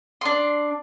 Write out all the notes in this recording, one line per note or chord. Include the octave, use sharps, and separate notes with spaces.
D4 C6